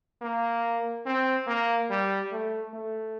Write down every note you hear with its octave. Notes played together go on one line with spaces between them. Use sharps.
A#3
C4
A#3
G3
A3
A3